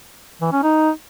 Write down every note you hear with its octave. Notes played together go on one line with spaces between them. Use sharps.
E3
C#4
D#4